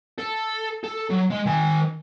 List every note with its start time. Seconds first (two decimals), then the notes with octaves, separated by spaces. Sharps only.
0.18 A4
0.84 A4
1.10 F#3
1.30 G#3 D#5
1.46 D#3 G#5